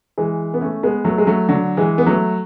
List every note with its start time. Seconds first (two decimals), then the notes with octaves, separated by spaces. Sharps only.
0.18 E3 G#3
0.54 B3
0.61 A3 C#4
0.83 G#3 B3
1.04 F#3 A3
1.18 G#3
1.27 F#3 A3
1.49 D3 F#3
1.77 E3 G#3
1.98 B3
2.06 F#3 A3